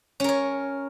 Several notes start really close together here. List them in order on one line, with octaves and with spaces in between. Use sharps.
C#4 A#4 C#5